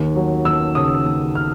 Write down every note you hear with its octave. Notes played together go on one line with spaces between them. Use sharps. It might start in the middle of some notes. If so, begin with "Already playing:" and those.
Already playing: D#2
F#3
D#2 E6
C#3 D#6
D#2
F6